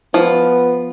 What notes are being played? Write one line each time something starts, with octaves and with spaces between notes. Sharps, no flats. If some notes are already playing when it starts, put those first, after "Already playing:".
F3 B3